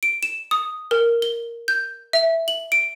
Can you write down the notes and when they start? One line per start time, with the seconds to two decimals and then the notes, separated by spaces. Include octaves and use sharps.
0.03 D7
0.23 E7
0.51 D#6
0.91 A#4
1.22 G7
1.68 G6
2.13 E5
2.48 F#7
2.72 D7